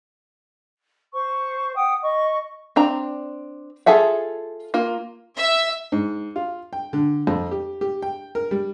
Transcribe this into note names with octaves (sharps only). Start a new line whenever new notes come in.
C5 C#6
F#5 G5 D#6
D#5 C#6
C4 D4 A#5
F4 G#4 A4 E5 F#5
A#3 F4
E5
G#2
F4
G5
D3
F2
G4
G4
G5
A#4
G3